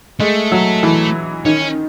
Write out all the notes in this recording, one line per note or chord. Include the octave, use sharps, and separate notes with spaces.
G#3 A3
F#3
E3
D#3 C#4